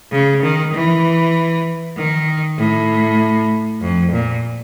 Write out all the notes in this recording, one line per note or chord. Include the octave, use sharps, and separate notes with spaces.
C#3
D#3
E3
D#3
A2
F2
A#2